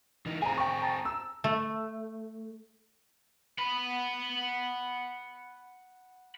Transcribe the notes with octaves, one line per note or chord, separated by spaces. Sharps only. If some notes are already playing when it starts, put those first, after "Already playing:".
E3 D#4
C4 G#4 G#5 A#5
G5 C#6
A5 A#5 A6
E6
A3
F#5 B5